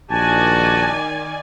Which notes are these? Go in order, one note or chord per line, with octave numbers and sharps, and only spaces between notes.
A#1 D#3 F#4 D5 G#5 A5